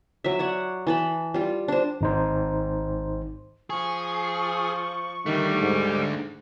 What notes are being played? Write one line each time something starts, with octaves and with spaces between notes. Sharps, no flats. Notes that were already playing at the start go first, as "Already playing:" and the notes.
F#3 E5
C#5 D5 F#5
E3 A5 B5
G3 F4
D4 C5
G#1 D#4 C5
F3 G#4 C#6
D3 D#3 G3 A3
G#2